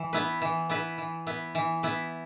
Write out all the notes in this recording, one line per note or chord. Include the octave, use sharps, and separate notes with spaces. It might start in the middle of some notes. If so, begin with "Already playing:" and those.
Already playing: E3
B3 E4 B4
E3
B3 E4 B4
E3
B3 E4 B4
E3
B3 E4 B4